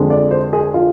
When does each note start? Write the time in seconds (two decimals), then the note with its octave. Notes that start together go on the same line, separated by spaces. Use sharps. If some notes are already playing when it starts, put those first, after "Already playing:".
Already playing: F2 D3 G#3
0.10 D5
0.31 C5
0.53 G#4
0.74 F4